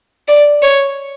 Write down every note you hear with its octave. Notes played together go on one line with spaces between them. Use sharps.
D5
C#5